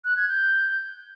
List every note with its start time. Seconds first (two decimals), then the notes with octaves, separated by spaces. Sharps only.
0.05 F#6
0.17 G#6
0.28 G6